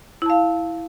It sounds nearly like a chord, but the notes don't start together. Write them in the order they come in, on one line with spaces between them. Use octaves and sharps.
E4 A5 F5